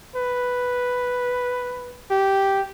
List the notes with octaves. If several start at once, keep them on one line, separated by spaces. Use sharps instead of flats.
B4
G4